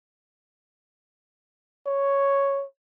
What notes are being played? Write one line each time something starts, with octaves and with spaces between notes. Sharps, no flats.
C#5